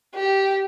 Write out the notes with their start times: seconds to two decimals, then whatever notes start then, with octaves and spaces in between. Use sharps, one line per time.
0.15 G4